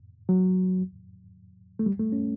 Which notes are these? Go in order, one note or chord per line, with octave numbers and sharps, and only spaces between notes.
F#3
A3
G3
A3
C#4